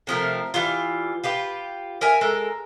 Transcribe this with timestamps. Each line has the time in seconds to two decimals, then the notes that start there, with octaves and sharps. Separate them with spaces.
0.07 C3 F3 A3 A#4
0.54 E3 G3 F4
1.24 F4 G4 B4
2.01 A#4 E5 G#5
2.21 G#3 A4 A#4